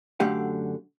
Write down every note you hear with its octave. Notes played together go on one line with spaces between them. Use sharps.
F#2 D3 A3 G4 F5 F#5